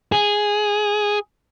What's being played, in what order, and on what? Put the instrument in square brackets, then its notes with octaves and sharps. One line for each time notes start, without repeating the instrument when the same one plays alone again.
[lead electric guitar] G#4